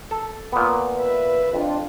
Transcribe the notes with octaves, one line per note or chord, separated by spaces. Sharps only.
A4
A#2 B3
B4 E5
F2 D4 F4